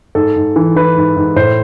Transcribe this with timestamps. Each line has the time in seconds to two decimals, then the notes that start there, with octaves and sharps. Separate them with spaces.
0.15 G#2 A4
0.36 G#2
0.56 E3
0.76 E3 B4
0.97 G#2
1.16 G#2
1.36 A2 C5